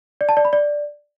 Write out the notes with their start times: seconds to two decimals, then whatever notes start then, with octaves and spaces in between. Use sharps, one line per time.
0.21 D5
0.29 A5
0.37 D5
0.45 B5
0.53 D5